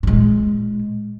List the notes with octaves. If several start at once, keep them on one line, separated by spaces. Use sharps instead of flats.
A#2 G#3